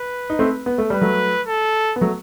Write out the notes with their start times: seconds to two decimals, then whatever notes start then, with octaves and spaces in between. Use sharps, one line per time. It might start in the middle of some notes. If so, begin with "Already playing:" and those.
Already playing: B4
0.30 D#4
0.39 A3 C4
0.66 B3
0.78 A3
0.90 G3 B4
1.01 F#3 A3
1.47 A4
1.96 B3
2.01 F#3 A3